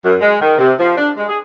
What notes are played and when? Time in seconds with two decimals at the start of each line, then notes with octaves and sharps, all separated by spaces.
0.05 F#2
0.21 G#3
0.41 D#3
0.58 C3
0.80 F3
0.98 D4
1.17 G#3
1.28 G#4